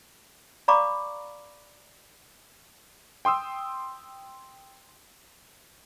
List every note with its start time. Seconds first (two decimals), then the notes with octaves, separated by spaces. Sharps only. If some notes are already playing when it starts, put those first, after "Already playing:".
0.68 D5 F5 A#5 B5 C#6 D6
3.25 G5 C6 D#6 E6